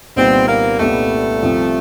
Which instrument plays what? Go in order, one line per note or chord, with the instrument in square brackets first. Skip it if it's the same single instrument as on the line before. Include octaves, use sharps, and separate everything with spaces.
[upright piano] C2 A#2 G3 B3 D#4 [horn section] C4
[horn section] A#3
[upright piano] C2 A#2 G3 B3 D#4 [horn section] A3
[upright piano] C2 C3 F3